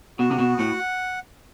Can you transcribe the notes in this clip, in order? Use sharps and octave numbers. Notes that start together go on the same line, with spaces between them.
B2 F#4
C3
B2
A2 F#5